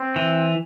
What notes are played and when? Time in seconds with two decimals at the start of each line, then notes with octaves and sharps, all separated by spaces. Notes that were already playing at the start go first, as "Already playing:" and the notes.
Already playing: C4
0.16 E3